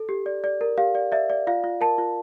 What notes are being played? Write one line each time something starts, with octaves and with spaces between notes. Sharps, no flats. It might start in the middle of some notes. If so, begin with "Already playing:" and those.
Already playing: A4
G4
D5
D5
A#4
G4 F5
D5
D5 E5
D5
F4 F5
F4
A#4 A5
F4